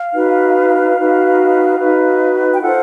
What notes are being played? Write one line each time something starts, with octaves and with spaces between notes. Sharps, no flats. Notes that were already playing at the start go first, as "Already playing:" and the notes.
Already playing: F5
D#4 F#4 B4
D#4 F#4 B4
D#4 F#4 B4
G5
F4 A4 C5 F#5